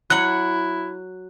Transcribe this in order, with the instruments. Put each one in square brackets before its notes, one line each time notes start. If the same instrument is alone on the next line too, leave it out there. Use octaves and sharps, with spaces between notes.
[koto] F#3 F#5 [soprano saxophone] E4 [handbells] F#6